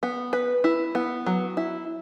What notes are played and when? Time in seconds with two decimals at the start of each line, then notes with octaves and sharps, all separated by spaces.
0.03 B3
0.33 B4
0.64 E4
0.95 B3
1.26 F#3
1.57 E4